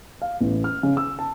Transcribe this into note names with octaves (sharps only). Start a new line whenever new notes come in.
F5
A1
F6
C#3
E6
A5